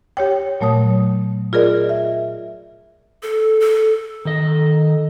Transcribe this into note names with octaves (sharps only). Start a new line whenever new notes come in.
G4 C#5 G5
A#2 F#3 A3 C#5 D#6
F4 G#4 A#4 D5 D#5
E5
A4
A4
D#3 A4 D#5